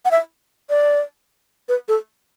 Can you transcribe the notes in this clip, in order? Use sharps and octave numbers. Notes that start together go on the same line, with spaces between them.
F#5
E5
D5
B4
A4